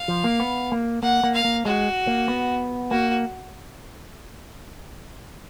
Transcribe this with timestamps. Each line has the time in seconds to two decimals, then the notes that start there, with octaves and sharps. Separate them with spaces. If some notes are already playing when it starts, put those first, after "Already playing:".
Already playing: F5
0.08 F3
0.24 A#3
0.40 B3
0.72 A#3
1.03 A#3 F#5
1.24 A#3
1.34 F5
1.45 A#3
1.65 G#3 F#4
2.07 A#3
2.28 B3
2.91 A#3 F#4